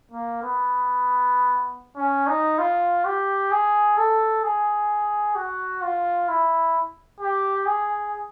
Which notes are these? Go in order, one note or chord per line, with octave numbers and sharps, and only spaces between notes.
A#3
B3
C#4
D#4
F4
G4
G#4
A4
G#4
F#4
F4
E4
G4
G#4